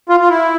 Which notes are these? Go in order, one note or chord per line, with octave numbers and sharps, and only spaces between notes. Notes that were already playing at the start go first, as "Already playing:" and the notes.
F4
F4
E4